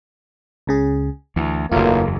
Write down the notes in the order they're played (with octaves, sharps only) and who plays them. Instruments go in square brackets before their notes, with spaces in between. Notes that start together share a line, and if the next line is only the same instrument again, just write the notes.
[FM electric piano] C#2 C#3 G#4
[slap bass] D2 [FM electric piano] E3
[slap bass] F#1 E2 [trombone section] B1 A3 A#3 [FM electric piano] F4